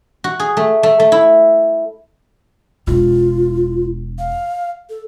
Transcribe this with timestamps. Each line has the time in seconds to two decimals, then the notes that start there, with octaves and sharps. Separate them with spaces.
0.24 F#4
0.40 G#4
0.57 A3
0.83 A3
1.00 A3
1.12 E4
2.87 E1 D4 F4
4.19 F5
4.90 A4